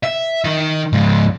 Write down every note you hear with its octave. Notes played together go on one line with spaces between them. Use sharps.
E5
D#3 D#4
C#2 G#2